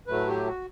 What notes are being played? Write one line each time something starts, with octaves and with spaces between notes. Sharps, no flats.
A2 F#3 A3 B4
G4
F#4